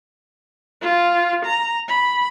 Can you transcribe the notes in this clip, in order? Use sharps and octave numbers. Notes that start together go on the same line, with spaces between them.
F4
A#5
B5